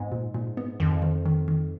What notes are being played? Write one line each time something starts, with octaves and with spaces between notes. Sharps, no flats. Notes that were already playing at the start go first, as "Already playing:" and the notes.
Already playing: G#2 B3
A#2
A#2
B3
F2 D#3
D#3
D#3
D#3